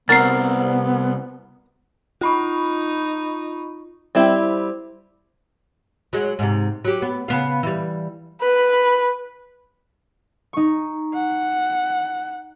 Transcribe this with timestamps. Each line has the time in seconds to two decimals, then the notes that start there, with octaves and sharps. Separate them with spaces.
0.09 C2 B3 C4 F#4 A#4 A6 C7
2.21 D#4 F4 B5 C#6
4.15 G3 C4 E4
6.13 F#3 G#3
6.39 G#2 C3
6.85 F#3 G4
7.02 B3
7.28 C#3 B3 F5
7.63 E3 G3
8.41 B4 B5
10.53 D#4 C#6
11.14 F#5